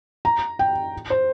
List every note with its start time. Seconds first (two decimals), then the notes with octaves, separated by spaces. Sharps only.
0.25 A#5
0.59 G5
1.10 C5